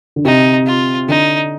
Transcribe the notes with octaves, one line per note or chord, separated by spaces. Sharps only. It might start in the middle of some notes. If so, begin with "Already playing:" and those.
D3
C3 D#4
F4
D3 D#4